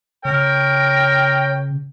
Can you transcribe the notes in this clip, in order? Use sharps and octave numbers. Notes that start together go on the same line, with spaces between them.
C#3 A#4 C#5 G5